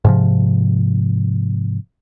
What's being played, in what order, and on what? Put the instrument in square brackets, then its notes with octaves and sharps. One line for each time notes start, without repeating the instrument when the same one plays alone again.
[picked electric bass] G#2 C3 F3